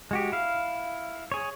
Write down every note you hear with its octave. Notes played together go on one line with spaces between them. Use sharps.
G#3 F#4 G4
E4 F5
G#4 C#5